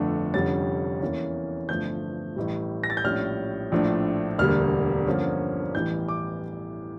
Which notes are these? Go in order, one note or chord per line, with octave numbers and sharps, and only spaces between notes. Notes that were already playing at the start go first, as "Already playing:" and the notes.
Already playing: G1 F2 D3 A3 D4
F1 F2 D3 G3 C#4 A6
E2 E3 A#3 C#4
G1 G2 F3 A3 G6
A1 A2 G3
A#6
A6
G6
A#1 A2 G3 C#4 F6
A#1 A2 F3 A3 D4
E1 D2 D3 G3 A#3 F6
G2 D3 F3 A#3 C#4
A1 A2 E3 G3 G6
D6